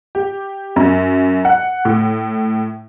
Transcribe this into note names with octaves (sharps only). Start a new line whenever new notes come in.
G4
F#2
F#5
A2